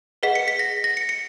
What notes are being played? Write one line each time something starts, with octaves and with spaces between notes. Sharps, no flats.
G#4 B4 D#5 F#5 B6
C#7
B6
A#6
A#6
C#7
C#7